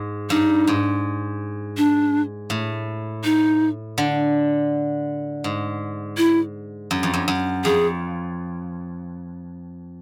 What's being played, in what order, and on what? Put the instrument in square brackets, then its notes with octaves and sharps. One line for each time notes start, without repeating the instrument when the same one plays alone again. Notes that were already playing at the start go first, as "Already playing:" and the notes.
Already playing: [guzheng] G#2
[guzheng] G2 [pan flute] D#4
[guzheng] G#2
[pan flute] D4
[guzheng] A2
[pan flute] D#4
[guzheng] D3
G#2
[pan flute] E4
[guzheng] F#2
F2
F#2
F#2
[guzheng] F2 [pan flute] G#4